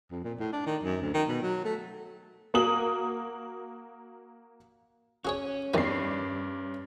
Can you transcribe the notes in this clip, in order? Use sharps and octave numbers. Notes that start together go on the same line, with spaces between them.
F2
A#2
A2
D4
D#3
F#2
D2
D#3
B2
F#3
A3
A#3 F#4 A#4 D#6 F#7
C#4 F#4 G#4 C#5
E2 G2 D#3 D5 G#5 C7